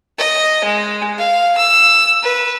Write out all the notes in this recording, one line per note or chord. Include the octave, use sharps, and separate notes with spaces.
D#5
G#3
F5
E6
B4